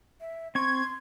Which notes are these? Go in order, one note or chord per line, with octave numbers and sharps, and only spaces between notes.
E5
C4 C6 C#6 G#6